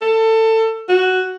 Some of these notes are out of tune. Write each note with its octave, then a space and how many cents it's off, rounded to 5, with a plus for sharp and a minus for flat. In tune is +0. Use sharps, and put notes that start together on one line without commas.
A4 +20
F#4 +5